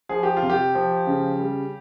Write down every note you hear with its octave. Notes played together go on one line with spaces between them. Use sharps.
F3 G#4
G4
F4
C3
G4
F3
C#3
G3